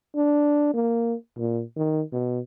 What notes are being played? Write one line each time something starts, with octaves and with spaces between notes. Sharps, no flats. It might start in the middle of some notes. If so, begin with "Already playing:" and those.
D4
A#3
A#2
D#3
B2